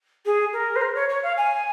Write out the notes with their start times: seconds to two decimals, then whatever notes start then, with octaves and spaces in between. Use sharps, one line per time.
0.26 G#4
0.53 A#4
0.76 C5
0.82 A#4
0.95 C#5
1.09 C#5
1.23 F5
1.37 G#5